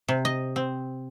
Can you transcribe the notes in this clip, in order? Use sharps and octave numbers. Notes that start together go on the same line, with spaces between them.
C3
D#5
C4